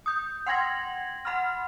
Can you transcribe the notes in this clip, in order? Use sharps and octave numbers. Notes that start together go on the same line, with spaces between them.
D#6 G6
F#5 G5 C6 G#6 A#6 F#7
F#5 B5 C6 F6